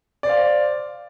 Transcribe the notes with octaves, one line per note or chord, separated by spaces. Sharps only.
C5 D5 F5